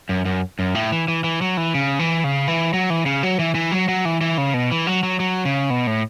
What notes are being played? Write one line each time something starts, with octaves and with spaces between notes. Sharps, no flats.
F#2
F#2
F#2
A2
E3
E3
E3
F#3
E3
C#3
E3
C#3
E3
F#3
E3
C#3
F#3
E3
E3
F#3
F#3
E3
E3
C#3
B2
E3
F#3
F#3
F#3
C#3
B2
A2